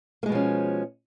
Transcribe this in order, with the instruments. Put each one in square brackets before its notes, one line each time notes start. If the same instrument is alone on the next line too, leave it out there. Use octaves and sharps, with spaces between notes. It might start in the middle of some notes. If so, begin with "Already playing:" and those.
[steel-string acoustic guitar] A#3
G#3
B2
F3
C#4